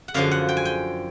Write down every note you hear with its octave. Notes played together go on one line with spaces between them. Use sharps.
F#5
F#2 D3 F3 F5
F#5
G5
G#5
G5